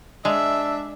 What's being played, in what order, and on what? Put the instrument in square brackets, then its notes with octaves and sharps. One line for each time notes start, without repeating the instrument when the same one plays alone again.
[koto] G#3 [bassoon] D4 [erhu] E5